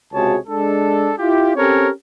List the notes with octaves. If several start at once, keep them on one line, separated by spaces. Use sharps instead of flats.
C#2 C3 F#4 G#4 C#5 A5
G#3 D4 A4
E4 F4 G4
C4 C#4 G4 A4 A#4 C#5